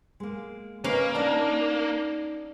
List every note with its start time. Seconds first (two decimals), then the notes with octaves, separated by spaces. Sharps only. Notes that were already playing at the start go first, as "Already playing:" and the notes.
0.20 G#3 A#3
0.84 A#3 C#4 A#4 B4 D#5 F5
1.15 D4 D#4 F#4 A#5